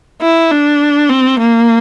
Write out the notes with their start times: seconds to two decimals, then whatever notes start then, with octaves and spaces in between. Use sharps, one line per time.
0.22 E4
0.51 D4
1.10 C4
1.39 A#3